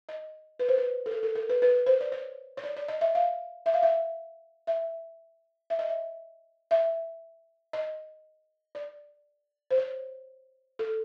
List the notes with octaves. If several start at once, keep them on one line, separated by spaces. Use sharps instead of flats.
D#5
B4
C5
B4
A4
A#4
A4
A#4
B4
B4
C5
D5
C#5
C#5
D5
D5
D#5
E5
F5
E5
F5
E5
E5
E5
D#5
E5
E5
D#5
D5
C5
C#5
A4